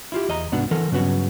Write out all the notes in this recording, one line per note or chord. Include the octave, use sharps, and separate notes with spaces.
E4 F4 G4
E2 D#5 A#5
C2 G#2 B3 D4 F#4 F#5
E3 A4 A#4 F#5
G2 C#3 F#3 B3 F#4